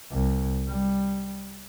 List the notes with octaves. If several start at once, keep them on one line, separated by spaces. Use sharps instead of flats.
C2
G3